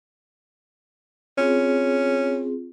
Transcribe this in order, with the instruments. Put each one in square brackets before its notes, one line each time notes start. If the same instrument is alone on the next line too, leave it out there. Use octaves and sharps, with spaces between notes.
[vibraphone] C4 F4 G#4 [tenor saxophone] C#4